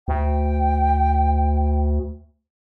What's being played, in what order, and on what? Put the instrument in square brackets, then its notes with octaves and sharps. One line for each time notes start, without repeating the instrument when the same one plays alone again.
[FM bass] D2 [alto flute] G5